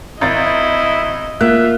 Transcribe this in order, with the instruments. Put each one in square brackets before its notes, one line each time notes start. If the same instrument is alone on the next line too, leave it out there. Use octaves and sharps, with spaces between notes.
[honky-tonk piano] G#1 A6 [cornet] E4 [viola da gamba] D#5
[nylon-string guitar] A#3 [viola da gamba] F4 [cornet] E5 [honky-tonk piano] F#6